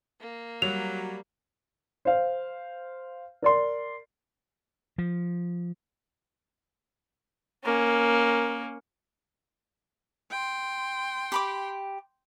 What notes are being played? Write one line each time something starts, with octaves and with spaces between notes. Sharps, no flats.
A#3
F#3 G3 F7
C5 F5
A#4 D5 C6
F3
A#3 C#4
G5 C6
G4 B5 D6